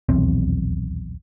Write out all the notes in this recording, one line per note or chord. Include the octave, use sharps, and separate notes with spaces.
D#1 B1 E2 C4